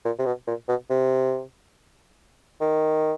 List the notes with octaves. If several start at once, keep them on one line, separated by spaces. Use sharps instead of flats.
A#2
C3
B2
A#2
B2
C3
D#3